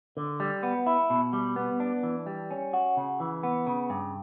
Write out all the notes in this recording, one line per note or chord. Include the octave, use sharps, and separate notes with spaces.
D3
G3
B3
E4
B2
G3
B3
D4
E3
G3
C#4
F#4
C#3
E3
B3
C#3
G2